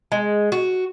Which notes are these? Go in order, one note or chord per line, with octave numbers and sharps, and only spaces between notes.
G#3
F#4